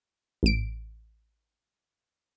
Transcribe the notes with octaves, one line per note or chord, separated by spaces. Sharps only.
A1 D7